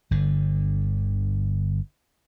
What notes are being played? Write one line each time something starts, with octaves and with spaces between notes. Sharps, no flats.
G1 D3